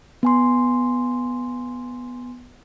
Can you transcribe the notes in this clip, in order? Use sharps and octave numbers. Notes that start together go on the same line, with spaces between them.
B3 G#5 C6